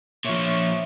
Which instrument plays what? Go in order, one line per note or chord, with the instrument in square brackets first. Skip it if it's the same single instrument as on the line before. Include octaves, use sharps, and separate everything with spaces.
[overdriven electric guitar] A#2 F3 [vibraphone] C#5 E5 C#6